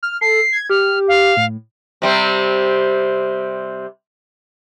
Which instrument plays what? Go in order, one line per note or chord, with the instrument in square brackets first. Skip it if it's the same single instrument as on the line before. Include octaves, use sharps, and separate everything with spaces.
[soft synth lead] F6
[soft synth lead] A4 [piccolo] C7
[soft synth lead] G#6
[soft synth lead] G4 [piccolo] F6
[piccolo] F5
[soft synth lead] A2
[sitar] C3 G3 C4